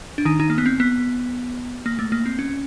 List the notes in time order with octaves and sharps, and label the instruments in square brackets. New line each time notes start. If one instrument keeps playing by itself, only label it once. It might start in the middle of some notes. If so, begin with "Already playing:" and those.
[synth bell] D4
D#3 D#4
D#3 D#4
A#3
B3
C4
B3
A#3
A3
A#3
C4
C#4